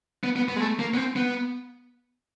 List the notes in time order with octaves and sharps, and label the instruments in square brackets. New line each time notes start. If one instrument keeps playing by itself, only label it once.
[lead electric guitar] B3
B3
B3
G#3
A3
A#3
B3
C4
B3